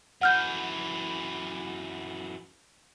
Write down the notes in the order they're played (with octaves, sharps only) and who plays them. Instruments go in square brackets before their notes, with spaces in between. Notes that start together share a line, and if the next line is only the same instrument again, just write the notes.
[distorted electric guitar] F#2 E3 [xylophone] F#5 F6 G6